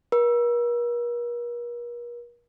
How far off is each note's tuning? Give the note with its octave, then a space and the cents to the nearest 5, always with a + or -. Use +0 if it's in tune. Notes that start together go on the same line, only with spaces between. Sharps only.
A#4 +45